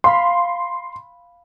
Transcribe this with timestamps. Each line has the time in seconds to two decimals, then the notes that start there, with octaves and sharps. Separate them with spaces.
0.04 F5 B5 C6 B6